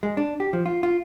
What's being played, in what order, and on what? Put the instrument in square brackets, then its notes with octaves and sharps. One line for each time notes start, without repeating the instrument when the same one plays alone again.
[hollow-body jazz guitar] G#3
D4
G4
F3
F4
F4